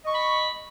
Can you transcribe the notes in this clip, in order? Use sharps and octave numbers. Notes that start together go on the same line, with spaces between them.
D#5 B5 C#6